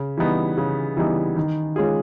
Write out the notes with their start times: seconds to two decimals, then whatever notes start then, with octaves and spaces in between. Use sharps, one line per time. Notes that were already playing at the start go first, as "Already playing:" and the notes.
Already playing: C#3
0.17 E3 G3 B3 D#4
0.58 C#3
0.97 E3 G3 B3 D#4
1.36 D#3
1.76 G#3 C#4 F4 G#4